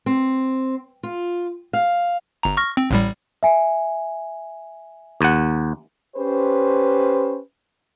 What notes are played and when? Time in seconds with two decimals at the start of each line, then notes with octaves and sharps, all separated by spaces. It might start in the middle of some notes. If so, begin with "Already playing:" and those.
0.06 C4
1.03 F4
1.73 F5
2.43 G1 A#5
2.57 C#6 F6 A#6
2.77 C4
2.91 A1 A2 G3
3.43 E5 G#5
5.21 D#2 F#5
6.16 C#4 G4 B4 C5